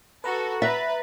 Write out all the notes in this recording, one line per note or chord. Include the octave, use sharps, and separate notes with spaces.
F#4 A4 B4 A#5
B4 E5 A#5 F#6 A6